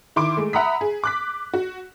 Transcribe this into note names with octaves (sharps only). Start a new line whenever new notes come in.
D#3 E4 C6 D6 D7
G#3 A3
E5 F#5 A#5 B5 D#6 B6
G#4
D6 F#6 B6
F#4